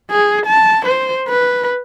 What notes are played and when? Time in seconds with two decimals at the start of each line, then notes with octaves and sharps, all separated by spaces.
0.11 G#4
0.47 A5
0.86 C5
1.29 B4